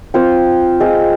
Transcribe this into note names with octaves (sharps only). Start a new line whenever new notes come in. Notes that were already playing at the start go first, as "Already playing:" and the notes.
C4 F4 C5
G#3 C4 F4